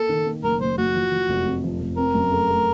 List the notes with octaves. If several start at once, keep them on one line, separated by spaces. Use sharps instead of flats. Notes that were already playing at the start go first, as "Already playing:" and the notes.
Already playing: A#3 A4
D#3
A#3
F#1 A#4
F#1 C5
F#1 F#4
F3
F3
F1
F2
F3
F1
C4 A#4
F#2
A3
A3